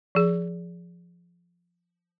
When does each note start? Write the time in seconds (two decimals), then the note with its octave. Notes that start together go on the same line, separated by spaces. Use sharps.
0.15 F3 G#4